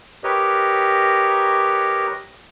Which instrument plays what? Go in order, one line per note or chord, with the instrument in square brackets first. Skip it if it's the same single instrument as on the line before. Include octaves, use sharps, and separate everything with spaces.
[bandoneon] G4 A#4 B4 C#5 D#5